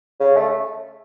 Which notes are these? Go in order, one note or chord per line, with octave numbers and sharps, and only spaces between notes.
C#3
A3